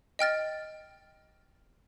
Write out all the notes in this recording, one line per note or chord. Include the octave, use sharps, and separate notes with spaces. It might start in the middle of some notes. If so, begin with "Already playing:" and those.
D#5 G5 F6 A6